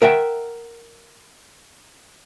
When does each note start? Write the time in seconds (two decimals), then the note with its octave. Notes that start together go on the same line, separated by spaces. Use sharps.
0.02 A#4 E5 F#5 G5